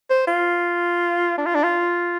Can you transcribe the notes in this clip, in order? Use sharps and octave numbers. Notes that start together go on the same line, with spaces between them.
C5
F4
D4
F4
D4
F4